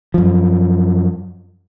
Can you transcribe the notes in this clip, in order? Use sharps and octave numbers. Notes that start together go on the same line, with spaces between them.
F#2 F3